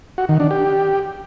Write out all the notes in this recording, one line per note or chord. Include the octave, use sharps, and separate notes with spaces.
F#4
D#3
D4
G4